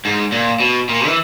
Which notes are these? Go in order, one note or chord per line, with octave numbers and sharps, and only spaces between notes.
G#2
A#2
B2
A#2
E3